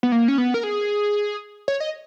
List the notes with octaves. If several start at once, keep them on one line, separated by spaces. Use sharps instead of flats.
B3
A#3
C#4
B3
A#4
G#4
C#5
D#5